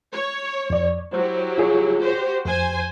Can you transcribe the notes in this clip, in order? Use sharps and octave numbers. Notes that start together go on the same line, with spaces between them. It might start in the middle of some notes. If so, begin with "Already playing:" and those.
C#5
F2 D5
F#3 E4 G4 C5
F4 G#4 C#5
F#4 G4 C5
F2 C5 G#5